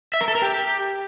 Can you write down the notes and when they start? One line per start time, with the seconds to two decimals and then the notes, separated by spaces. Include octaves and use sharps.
0.14 E5
0.21 A#4
0.28 A4
0.35 A#4
0.42 G4